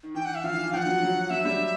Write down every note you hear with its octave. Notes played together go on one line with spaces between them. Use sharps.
D#3
E3 G5
F#5
E5
F3 F5
E3
E3
F3 F#5 G5
F#3
F#3
F#3 E5
G3